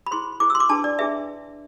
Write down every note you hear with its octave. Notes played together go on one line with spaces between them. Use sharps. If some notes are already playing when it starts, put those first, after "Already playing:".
B5
E4 G#4 C5 C6
E4 G#4 C5 D6
E6
C6
D6
D4 G#4 B4 A5
D5
D4 G#4 B4 E5